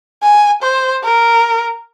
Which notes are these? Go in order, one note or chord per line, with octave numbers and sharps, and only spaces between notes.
G#5
C5
A#4